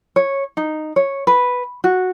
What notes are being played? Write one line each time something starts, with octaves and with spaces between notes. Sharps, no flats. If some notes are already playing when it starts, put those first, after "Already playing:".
C#5
D#4
C#5
B4
F#4